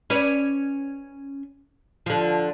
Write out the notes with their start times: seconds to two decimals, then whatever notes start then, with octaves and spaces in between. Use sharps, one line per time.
0.10 C#4 B4 D5
2.06 D3 F3